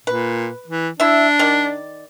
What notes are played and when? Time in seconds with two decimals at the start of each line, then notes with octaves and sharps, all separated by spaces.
0.07 A#2 B4
0.68 E3
1.00 D4 E4 E5
1.39 D#3 D5